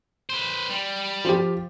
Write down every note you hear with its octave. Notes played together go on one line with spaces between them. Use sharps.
B4 C5
G3
F3 F4 G4